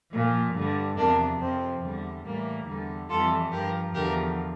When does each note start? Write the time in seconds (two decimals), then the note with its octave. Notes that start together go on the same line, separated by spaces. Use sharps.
0.11 A#2 F3
0.54 G2 D3 G3
0.96 E2 C3 F3 A#3 D4
1.39 F2 C3 F3 C4
1.81 E2 D3 G3
2.24 A2 E3 G3 A#3
2.66 E2 D3 G3
3.08 F2 E3 G3 F4 A4
3.51 G2 F3 G4 A#4
3.94 E2 D3 F3 G4 A#4